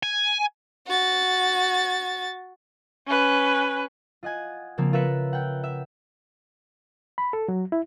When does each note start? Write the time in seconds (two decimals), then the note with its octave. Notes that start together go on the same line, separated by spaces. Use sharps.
0.03 G#5
0.87 F#4 A6
3.07 C#4 B4
4.23 F4 D#5 F#5 G#5
4.78 C#3 F3 A#3 C4
4.93 F4 A#4 B4 E5 F#6 C#7
5.33 F#5 G5
5.63 E5
7.18 B5
7.33 A4
7.48 F#3
7.72 E4